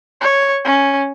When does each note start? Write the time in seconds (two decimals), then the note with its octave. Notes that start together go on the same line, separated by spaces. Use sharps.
0.21 C#5
0.65 C#4